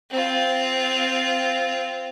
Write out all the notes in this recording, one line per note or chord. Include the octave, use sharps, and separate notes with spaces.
C4 F4